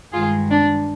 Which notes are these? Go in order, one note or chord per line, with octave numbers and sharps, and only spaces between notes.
G2 D#3 G#3 F4 G#4
D4